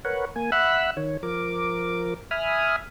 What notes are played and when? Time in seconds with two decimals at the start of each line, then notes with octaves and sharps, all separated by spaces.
0.05 A#4 B4 C#5 F#5
0.36 A#3 G#5
0.52 E5 F#5 B5 E6 F#6
0.97 D#3 C#5
1.23 F3 A#4 D6
2.31 E5 G#5 B5 D#6 F6